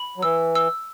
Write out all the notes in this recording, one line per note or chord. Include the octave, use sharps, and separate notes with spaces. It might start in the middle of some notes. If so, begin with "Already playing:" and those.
Already playing: B5
F#3
E3 E6
E6